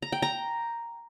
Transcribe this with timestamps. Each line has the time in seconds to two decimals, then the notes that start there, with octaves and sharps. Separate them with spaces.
0.02 A#5
0.12 G5
0.22 A#5